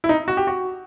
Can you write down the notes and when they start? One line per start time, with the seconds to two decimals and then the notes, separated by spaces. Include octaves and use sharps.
0.04 E4
0.09 D#4
0.28 F#4
0.37 G4
0.47 F#4